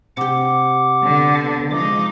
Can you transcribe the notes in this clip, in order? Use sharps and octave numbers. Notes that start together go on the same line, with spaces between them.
C3 G4 F#5 D6
D3 B3
F3 G#3 D#4 D6